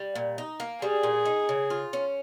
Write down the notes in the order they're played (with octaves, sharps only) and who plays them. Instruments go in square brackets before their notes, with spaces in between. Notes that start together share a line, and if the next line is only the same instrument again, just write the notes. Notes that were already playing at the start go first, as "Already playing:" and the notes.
Already playing: [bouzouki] G3
A#2
D#4
A#3
[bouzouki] G3 [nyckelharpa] G#4
[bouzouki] A#2
D#4
C#3
F4
C#4